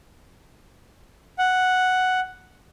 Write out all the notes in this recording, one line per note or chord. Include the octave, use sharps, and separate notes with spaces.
F#5